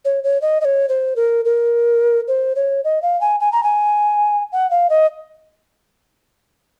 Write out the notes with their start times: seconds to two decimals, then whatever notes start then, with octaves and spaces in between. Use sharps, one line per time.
0.05 C#5
0.24 C#5
0.42 D#5
0.61 D#5
0.65 C#5
0.89 C5
1.16 A#4
1.45 A#4
2.28 C5
2.56 C#5
2.84 D#5
3.02 F5
3.21 G#5
3.40 G#5
3.52 A#5
3.63 G#5
4.52 F#5
4.70 F5
4.90 D#5